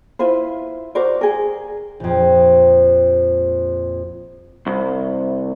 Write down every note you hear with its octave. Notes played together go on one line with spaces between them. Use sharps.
E4 F4 B4 C5
F#4 A#4 C5 D5
G#4 A#4
A#1 F2
C2